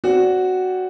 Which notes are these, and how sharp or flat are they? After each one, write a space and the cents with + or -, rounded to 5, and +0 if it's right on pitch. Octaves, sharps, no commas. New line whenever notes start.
C4 +0 F#4 +0 D5 -25